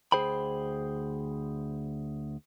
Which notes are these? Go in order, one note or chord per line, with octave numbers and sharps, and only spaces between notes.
D2 G#4 C5 G5 B5